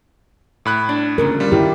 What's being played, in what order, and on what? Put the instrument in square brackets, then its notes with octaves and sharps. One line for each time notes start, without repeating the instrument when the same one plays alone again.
[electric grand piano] A2 B5 F#6
[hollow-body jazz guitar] D4
[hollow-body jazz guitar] D2 A#2 C#3 [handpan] A#4
[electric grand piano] G3 F4
[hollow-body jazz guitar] D#3 [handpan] E4 G4